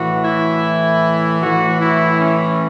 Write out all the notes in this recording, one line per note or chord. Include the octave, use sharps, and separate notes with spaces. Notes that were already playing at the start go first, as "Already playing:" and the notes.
Already playing: A2 E3 F#4
E4
A2 E3 F#4
E4
C#4